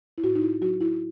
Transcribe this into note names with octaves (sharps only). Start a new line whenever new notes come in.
E4
A2 F#4
D#4
E4
F#3 F#4
E4